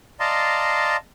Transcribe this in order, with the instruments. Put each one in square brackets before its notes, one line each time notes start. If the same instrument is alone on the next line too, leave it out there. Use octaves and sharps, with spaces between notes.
[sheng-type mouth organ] D5 D#5 F5 A5 A#5 C6